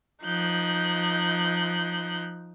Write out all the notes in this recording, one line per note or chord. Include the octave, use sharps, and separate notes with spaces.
F3 D#4 F#6 G6